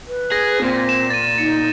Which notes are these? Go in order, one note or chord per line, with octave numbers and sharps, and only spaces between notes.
B4
G#4 A#6
A#2 C4
E7
A6 D#7
D#4 C#7